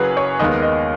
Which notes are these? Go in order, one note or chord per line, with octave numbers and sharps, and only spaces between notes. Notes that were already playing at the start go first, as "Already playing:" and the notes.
Already playing: F#1 F#2 F#3 G#4 B4
C#5
D#2 D#3 G#3 B3 D#5
D#5